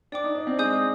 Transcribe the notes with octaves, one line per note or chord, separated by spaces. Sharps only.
D4 D5 G5 D6
D#4
D4
C4
G#3 D#5 G#5 D#6 G6